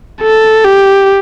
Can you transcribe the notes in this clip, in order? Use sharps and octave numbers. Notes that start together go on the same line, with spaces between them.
A4
G4